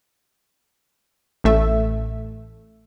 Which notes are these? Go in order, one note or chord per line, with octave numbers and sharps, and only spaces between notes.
A1 A3 E5